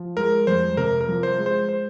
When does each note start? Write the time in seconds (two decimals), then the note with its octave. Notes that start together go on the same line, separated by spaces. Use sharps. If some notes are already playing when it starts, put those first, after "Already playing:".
Already playing: F3
0.17 G#3 A#4
0.47 F2 C5
0.77 C3 A#4
1.01 A#4
1.08 F3
1.23 C5
1.38 G#3
1.46 C5
1.69 C5